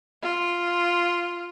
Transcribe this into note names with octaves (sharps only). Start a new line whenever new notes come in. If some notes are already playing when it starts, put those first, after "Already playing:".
F4